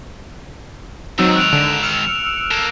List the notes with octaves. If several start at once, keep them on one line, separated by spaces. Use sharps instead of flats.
G#2 D#3 F#3 C4 D#4 E6
F#6 D7 F7
D3 D7 E7
E6 F6 C#7
A#3 A4